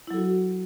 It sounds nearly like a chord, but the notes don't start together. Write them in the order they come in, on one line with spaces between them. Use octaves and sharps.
E4 F#3 A4 F#4